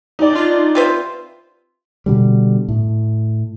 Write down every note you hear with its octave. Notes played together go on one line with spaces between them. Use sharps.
D#4 D5
D4 F4
C3 F4 B4 C5
B2 D3 G3
A2